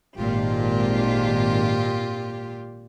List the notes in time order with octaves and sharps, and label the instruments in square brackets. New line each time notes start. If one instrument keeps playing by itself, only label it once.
[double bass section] G#1 [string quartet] A#2 F4 G4